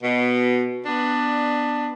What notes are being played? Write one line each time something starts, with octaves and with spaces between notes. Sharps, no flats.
B2
B3 D4